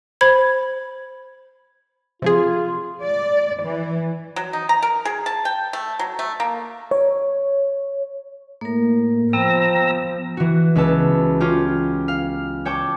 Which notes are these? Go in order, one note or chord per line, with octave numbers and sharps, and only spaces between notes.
C5 B5 G#6
C3 F3 F4 G#4
D5
E3
F#3
D#4
A#5
A#4
G#4
A5
G5
A3
F#3
A3
A#3
C#5
A2 A#3 A#4
F3 B3 G5 A#5 E6 A#6
E3 F#4
C#2 B3 B4 A5 E6
C#4 F4 G4
F5
C#5 G5 A5 D6